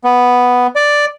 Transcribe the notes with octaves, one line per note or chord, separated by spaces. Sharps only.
B3
D5